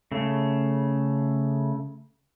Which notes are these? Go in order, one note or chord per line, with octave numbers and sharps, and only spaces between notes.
C#3 A3